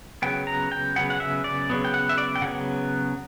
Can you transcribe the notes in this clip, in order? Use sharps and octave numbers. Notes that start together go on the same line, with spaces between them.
C#3 F#3 B3 G5
A#5
G5
C#3 F#3 B3 F#5
F#5
E5
D5
C#3 F#3 B3
G5
F#5
E5
D5
G5
C#3 F#3 B3 F#5